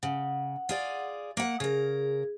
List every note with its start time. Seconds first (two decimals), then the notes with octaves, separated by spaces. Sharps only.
0.03 C#3 F#5
0.69 F4 G#4 D5
1.37 A#3 F#5
1.60 C#3 G#4 A#4